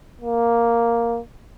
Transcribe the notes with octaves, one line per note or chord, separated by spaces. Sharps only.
A#3